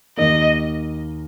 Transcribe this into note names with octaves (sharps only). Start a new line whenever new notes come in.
D#2 D#3 A#3 D#5